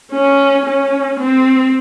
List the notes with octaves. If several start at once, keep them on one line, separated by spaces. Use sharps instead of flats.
C#4
C#4
C4